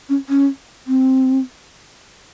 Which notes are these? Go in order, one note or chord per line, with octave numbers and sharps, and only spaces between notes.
C#4
C#4
C4